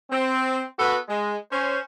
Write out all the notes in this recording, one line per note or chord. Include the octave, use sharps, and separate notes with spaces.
C4
B3 F#4 A4 B4
G#3
C#4 C5